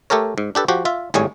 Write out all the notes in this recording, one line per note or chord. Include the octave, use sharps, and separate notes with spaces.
A3 G4 A4 A#4 C#5
G#2
D4 G4 A4 B4
F3 F#4 G4
F4 E5
G#1 A2 G3 G#4 C#5 G#5